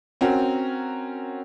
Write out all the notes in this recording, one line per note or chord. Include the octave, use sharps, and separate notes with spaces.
C4 C#4 F#4 A#4